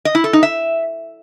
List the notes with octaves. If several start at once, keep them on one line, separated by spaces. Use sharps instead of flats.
D#5
E4
A4
D#4
E5